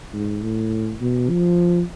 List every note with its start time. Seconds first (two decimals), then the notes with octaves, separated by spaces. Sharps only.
0.14 G#2
0.42 A2
1.01 B2
1.30 F3